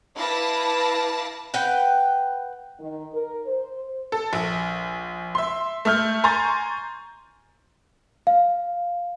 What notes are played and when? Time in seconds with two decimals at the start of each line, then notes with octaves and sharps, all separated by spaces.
0.17 E4 B4 F5 A5 D6 A#6
1.54 B4 F#5 G5
2.79 D#3
3.14 A#4
3.46 C5
4.12 A4
4.33 A#1
5.35 E5 C6
5.85 A3 E5 F6 G6
6.24 G#5 A#5 C6 C#6 G6 A6
8.27 F5